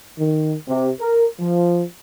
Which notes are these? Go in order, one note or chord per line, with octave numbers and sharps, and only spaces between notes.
D#3
C3
A#4
F3